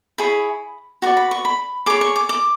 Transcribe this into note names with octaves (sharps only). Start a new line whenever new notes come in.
E4 G#4 C#5 B5
F#4 B4 D5 C#6
B5
C#6
B5
G#4 C#5 D6
C#6
D6
D6